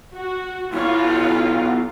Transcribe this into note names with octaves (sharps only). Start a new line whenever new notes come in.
F#4
B1 E4 F4 C#5